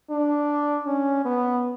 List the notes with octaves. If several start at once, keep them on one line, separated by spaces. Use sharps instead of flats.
D4
C#4
B3